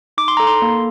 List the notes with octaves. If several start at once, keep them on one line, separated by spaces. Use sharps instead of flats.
D#4 D6
C6
A4 A#5
C6
A#3